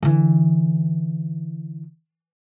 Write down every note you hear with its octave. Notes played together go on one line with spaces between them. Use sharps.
D3 E3